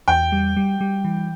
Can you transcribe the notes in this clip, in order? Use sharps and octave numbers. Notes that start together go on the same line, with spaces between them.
E2 G5
G3
G3
G3
E3